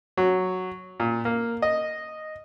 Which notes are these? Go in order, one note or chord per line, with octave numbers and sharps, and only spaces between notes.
F#3
A#2
A#3
D#5